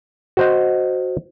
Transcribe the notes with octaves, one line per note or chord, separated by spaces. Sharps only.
F#4 C5 D#5